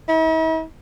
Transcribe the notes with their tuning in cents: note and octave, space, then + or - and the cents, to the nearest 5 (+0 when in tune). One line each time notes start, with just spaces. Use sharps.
E4 -45